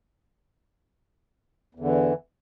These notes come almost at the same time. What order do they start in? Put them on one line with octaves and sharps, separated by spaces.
E2 D3 E3